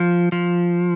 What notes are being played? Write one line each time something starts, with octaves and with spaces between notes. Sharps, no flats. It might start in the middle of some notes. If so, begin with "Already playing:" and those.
Already playing: F3
F3